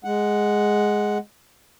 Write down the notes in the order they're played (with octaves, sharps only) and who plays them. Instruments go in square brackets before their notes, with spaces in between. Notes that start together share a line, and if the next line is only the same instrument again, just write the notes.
[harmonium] G#3 F#5